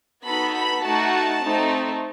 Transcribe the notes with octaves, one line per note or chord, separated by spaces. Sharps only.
B3 D#4 F#4 A4 B5
B5
A3 D#4 F#4 A5
A3 C4 D#4